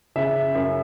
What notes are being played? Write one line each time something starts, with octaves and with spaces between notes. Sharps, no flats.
C#3 E5
F#2